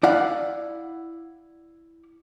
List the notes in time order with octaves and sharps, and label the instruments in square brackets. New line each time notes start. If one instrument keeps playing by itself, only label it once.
[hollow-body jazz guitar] E4 D5 F5 F#5